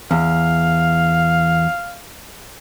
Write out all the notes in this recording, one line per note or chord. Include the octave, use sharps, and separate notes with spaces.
E2 F5